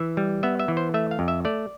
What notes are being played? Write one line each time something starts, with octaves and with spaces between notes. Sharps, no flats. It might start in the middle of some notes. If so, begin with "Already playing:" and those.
Already playing: E3 E5
G3
B3 E5
E5
E3
C5
A3 E5
F5
F2
E5
A3 D5